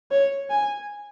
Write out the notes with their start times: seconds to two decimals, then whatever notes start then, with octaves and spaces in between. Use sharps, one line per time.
0.12 C#5
0.50 G#5